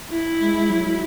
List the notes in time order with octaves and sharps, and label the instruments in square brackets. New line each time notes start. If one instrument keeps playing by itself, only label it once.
[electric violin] E4
[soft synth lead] G#3
G#3
F#3